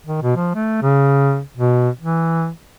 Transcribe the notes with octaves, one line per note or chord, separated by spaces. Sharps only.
D#3
B2
F3
A3
C#3
B2
E3